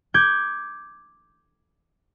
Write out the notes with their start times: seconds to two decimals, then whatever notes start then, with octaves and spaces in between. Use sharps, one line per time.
0.14 D6 G6 G#6